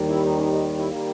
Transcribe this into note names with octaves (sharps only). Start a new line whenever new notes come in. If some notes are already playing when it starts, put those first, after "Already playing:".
Already playing: D#2 D#3 G3
E4
D#4
C#4
D#4
D#4
E4
D#3 G3 A#3